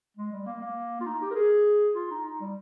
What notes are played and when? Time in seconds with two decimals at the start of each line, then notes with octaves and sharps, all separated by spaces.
0.17 G#3
0.32 G3
0.46 A#3
0.61 A#3
1.01 F4
1.06 D#4
1.21 G4
1.30 A#4
1.35 G#4
1.95 F4
2.11 D#4
2.26 D#4
2.40 G3